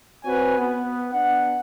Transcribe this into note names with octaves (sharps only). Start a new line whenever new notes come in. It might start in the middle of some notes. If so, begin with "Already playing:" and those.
C4 F#4 B4 C#5 G#5
B3
B3 D4 F#5